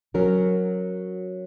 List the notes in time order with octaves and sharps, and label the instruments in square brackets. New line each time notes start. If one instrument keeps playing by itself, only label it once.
[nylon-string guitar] F#3 C#4 F#4 A#4